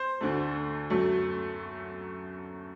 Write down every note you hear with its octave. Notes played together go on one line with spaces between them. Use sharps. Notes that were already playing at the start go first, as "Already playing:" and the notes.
Already playing: C5
D2 D3 A3
F#2 F#3 A3